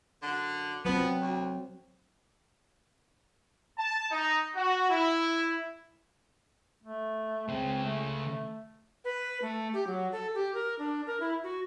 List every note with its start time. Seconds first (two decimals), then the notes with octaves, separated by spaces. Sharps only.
0.23 F#2 D3
0.85 F3 F#3 B3 C4
1.20 D2
3.78 A5
4.11 D#4
4.54 F#4
4.89 E4
6.84 A3
7.49 C#3 G#3 C4
7.84 A3
9.05 B4
9.42 A3
9.73 G4
9.87 F#3
10.12 A4
10.35 G4
10.55 A#4
10.79 D4
11.07 A#4
11.20 E4
11.43 F#4